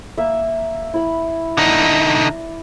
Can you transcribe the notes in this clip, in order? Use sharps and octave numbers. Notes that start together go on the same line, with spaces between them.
A#3 E5
E4 B5
D3 D#4 D5